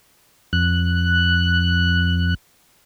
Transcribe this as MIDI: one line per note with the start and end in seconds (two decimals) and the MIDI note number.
0.53 2.34 41
0.53 2.34 90